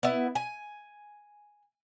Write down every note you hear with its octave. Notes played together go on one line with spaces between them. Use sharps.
B3 E4
G#5